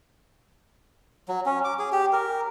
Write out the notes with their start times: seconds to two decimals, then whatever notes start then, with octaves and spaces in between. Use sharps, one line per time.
1.28 F#3
1.46 C#4
1.64 D6
1.79 G#4
1.92 G4
2.13 A#4